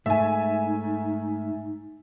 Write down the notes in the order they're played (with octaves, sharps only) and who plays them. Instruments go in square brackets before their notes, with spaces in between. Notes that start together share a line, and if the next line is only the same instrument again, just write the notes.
[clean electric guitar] G#2 A3 [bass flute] D#4 [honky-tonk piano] E5 G#5